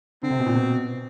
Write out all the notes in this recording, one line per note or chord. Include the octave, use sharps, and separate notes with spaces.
D3 C4
C3
B2
A#2
B2